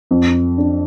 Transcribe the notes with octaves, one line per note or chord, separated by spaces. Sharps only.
F2
D4